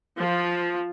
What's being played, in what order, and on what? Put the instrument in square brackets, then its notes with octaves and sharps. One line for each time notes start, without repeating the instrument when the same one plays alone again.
[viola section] F3